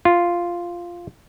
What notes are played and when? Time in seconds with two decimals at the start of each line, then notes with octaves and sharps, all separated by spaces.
0.05 F4